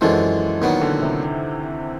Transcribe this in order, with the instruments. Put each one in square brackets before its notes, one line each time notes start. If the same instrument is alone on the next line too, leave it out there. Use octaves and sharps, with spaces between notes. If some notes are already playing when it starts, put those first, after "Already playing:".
[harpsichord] F#2 D3 F3 G#3 [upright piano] E3
[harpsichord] A#2 F#3 B3 [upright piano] D#3
[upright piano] D3
C3